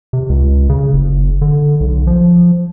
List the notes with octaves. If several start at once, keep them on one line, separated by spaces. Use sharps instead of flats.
C3
C#2
C#3
F#1
D3
B1
F3